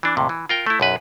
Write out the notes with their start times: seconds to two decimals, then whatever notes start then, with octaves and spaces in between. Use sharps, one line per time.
0.03 E3 D4
0.17 D#2 A2 C3
0.29 E3
0.49 F4 A#4 G5
0.66 A3 E4
0.80 B1 F#2 B4